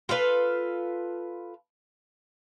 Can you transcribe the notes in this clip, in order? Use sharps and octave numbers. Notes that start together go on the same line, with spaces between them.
F4 A4 B4 F5